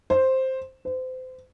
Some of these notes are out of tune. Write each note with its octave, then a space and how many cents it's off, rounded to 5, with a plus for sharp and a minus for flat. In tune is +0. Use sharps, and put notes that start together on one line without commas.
C5 +5
C5 -30